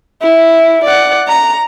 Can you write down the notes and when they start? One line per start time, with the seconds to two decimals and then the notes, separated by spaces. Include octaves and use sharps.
0.22 E4
0.85 D5 F#5
1.28 A#5